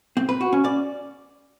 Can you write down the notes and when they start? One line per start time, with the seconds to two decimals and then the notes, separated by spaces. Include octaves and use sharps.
0.17 C4
0.29 B4
0.41 F#4
0.53 C#4
0.65 D5